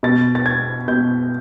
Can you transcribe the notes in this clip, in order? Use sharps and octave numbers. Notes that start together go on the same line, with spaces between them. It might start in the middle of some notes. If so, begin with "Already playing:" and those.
B2 A6
A6
G#6
B2 G6